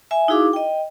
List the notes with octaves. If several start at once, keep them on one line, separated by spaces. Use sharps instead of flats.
E5 G#5
D#4 E4 F#4 G#4 F5 D6
D#5 G5